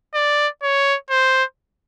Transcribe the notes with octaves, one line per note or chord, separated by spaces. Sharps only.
D5
C#5
C5